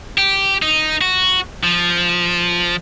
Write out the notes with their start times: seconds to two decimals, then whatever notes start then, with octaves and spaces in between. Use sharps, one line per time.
0.18 G4
0.62 D#4
1.01 F#4
1.64 F3